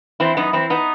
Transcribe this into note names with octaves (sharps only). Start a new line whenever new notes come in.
E3 C4 E4
F#2 B3 D#4
E3 C4 E4
B3 D#4